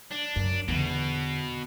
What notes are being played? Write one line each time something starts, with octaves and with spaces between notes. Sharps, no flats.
D4
F#2
E2 B2 D3